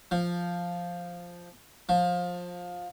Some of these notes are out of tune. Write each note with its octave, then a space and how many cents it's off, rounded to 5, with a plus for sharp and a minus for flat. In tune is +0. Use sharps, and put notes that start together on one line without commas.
F3 +0
F3 +20